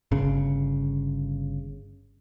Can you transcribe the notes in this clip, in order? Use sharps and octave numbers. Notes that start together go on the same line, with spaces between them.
G1 C#3